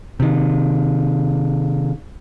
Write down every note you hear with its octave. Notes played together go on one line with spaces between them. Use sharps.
C3 D#3